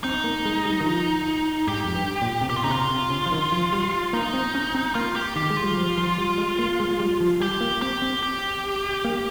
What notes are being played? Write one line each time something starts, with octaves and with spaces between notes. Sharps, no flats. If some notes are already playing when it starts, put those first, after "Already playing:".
C4 D#4
A#3
G#3
G3
D#3
F3
G#2 G4
F2
G2
A#2
C3
A#2 G4
F4
C#3 D#4
C3 F4
C3
C#3
F3
D#3
F3
G3
A#3 D#4
C4
C#4
C4
A#3 F4
G4
D#3 G4
G#3
F4
G3
F3
F3
G3
G#3
A#3
G#3
G3
F3
G3 G4
A#3
C4 G4
C4
G4
A#3